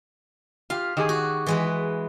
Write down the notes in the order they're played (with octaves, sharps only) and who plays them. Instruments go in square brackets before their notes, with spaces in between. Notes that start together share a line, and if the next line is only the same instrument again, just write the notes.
[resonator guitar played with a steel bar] F4 G4 [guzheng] F5
[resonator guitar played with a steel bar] D#3 G4 G#4
[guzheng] F#4
E3 G#3 B4